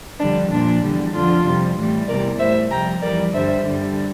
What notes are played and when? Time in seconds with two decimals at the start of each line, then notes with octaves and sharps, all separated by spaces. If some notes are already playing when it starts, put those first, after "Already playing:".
0.20 F2 D3 G3 D4
0.51 A#2 F3 D4
0.83 E2 D3 G3
1.14 F2 D3 F3 D4 F4
1.45 F2 C3 G3
1.77 A2 E3 G3
2.08 E2 C3 E3 G3 A#4 D5
2.39 A2 G3 C5 E5
2.70 F2 C3 G3 G5 A#5
3.02 F2 E3 G3 A#4 D5
3.33 G2 D3 G3 C5 E5
3.65 G2 D3 G3